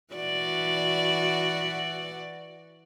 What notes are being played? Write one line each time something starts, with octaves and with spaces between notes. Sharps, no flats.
E3 F#4 D5